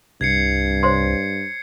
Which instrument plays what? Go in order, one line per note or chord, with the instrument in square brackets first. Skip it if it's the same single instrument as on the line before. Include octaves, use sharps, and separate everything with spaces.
[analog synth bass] C2 [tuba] G2 [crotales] G#6 C7 C#7
[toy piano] C5 C#5 C6